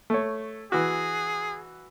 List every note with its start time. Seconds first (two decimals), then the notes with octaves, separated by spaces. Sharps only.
0.10 A3 C#5
0.72 E3 F#4 G#4